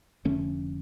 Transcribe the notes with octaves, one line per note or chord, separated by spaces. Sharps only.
F1 F2 D3 A3 C#4